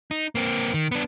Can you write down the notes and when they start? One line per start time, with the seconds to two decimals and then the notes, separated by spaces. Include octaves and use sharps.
0.11 D#4
0.35 A#3 C4
0.74 D#3
0.91 B3 D4